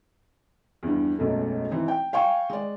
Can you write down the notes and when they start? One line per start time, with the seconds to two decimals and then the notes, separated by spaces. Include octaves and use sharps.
0.83 E2 G2
1.19 E1 B1 F#2 A3
1.71 E3 C4 D#4
1.88 G5
2.13 F5 G5 G#5 C#6
2.50 G#3 D5